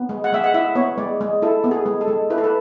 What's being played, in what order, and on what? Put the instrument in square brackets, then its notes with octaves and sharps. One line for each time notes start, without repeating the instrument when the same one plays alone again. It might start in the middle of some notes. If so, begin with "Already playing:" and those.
Already playing: [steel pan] B3
G#3
F#5
G#3 E5
F#5
E4 E5
B3 C#5
G#3 D5
G#3
E4 A4
B3
G#4
G#3
A4
G#3
E4 B4
A4
B4